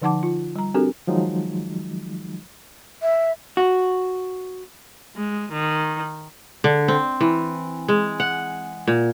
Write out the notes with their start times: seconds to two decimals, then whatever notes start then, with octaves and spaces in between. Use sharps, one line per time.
0.02 D3 F3 D#4 F#5 A5 D6
0.23 F4
0.56 G3 A#5
0.74 C4 D4 F#4 G4 A4 A#4
1.07 D#3 F3 F#3 G#3 D#4
3.02 E5
3.57 F#4
5.16 G#3
5.52 D#3
6.64 D3
6.88 C4
7.21 E3
7.88 G#3
8.20 F#5
8.87 A#2